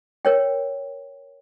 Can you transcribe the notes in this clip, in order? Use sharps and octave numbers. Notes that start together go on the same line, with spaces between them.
A#4 C#5 G5